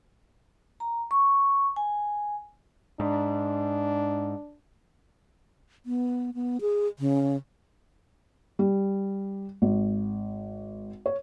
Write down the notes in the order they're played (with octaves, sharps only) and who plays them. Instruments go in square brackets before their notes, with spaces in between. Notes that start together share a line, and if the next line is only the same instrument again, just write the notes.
[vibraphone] A#5
C#6
G#5
[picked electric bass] G#2 [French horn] D4
[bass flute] B3
B3
G#4
C#3
[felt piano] G3
G#1
C#5